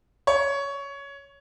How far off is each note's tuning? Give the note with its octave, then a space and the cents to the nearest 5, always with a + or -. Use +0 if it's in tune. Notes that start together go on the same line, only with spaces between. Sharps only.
C#5 +15